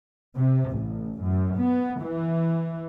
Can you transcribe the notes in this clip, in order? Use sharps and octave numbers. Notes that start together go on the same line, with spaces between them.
C3
A1
F#2
B3
E3